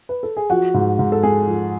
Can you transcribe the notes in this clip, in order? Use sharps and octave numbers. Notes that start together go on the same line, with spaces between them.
B4
A4
G#4
F3 F#4
G#2
G#2
A4
G#3 G#4
F3